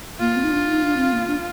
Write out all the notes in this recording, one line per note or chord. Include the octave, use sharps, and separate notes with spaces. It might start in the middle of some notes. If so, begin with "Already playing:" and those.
A#3 F4
C4
D#4
D4
D#4
D4
C4
A#3
D4